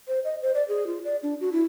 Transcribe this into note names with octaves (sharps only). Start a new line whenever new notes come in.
C5
D#5
C5
D5
G#4
F4
D5
D4
F#4
E4